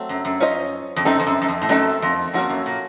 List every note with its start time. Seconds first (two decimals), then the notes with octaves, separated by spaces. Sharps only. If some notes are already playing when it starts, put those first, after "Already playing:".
Already playing: F#3 A3 C4
0.09 F#2
0.25 F#2
0.40 C#4 F4 C5 D#5
0.96 F2
1.05 F#2 C4 D#4 A4
1.20 F2
1.27 F#2
1.42 F#2
1.48 F2
1.62 A2
1.69 F#2 D#3 A3 C4 D#4 A4
2.02 F2
2.33 F2 A#3 C#4 F#4 A4
2.50 F#2
2.66 A#2